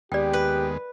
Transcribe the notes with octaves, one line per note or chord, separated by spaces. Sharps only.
D#2 G#3 B3 G4 D5 G5
B4